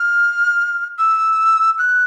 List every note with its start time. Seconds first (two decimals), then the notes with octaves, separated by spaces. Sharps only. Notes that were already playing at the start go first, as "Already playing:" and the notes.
Already playing: F6
0.98 E6
1.79 F#6